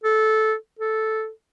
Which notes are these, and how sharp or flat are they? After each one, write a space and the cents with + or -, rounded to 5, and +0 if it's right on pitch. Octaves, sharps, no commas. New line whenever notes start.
A4 -15
A4 -5